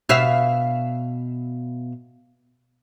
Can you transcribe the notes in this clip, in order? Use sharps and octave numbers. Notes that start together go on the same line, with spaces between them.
B2 E5 F5